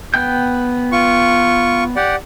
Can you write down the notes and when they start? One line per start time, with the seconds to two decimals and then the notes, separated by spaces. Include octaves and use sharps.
0.14 B3 G5 G6
0.92 F4 C#6
1.96 G4 D5 F#5